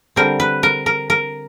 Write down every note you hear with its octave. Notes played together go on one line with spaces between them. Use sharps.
D3 G3 C4 A#4
B4
A#4
A#4
A#4